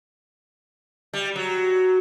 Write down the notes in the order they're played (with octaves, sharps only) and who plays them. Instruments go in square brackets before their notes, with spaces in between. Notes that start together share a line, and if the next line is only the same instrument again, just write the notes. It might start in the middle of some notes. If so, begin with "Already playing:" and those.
[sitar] G3
F#3